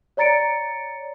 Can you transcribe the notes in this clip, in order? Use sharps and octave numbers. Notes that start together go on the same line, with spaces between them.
C#5 D5 A#5 A6 C#7 D7